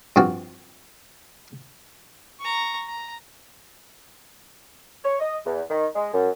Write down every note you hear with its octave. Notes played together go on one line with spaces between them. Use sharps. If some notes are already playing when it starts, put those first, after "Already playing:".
G2 F3 C4 F#4
A#5 C#6
A#5
C#5
D#5
E2
D#3
G#3
F#2